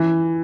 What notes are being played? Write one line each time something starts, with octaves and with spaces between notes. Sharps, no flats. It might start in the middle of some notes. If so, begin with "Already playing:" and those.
Already playing: E3